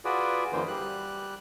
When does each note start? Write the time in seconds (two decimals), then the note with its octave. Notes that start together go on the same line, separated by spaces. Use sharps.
0.05 F4 F#4 G#4 B4 D5
0.53 F#2 D3 E3 A#3 C5
0.68 G3 F#6